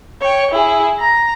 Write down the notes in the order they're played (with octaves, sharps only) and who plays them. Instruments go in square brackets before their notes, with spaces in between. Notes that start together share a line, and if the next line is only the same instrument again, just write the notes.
[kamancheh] C#5 G5
E4 G#4
A#5